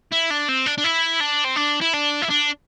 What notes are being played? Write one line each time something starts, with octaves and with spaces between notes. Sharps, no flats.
E4
D4
C4
D4
D4
E4
D4
C4
D4
E4
D4
E4
D4